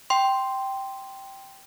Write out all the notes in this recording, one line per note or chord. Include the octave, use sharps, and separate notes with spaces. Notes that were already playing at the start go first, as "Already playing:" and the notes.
G5 C6